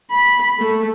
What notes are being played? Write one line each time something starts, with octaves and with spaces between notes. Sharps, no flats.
B5
A3